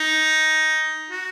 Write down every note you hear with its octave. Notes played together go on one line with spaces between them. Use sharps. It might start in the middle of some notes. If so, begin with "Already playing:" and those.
Already playing: D#4
F#4